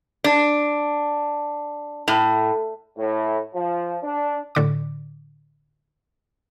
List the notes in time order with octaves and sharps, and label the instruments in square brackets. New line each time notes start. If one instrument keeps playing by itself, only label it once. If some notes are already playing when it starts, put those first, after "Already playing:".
[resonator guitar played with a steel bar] D4
A2
[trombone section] A2
F3
D4
[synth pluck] A2 D3 D6